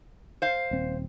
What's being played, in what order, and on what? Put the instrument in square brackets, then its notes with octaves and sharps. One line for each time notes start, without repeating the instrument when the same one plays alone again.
[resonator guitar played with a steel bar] C5 F5
[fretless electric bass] D#1 C4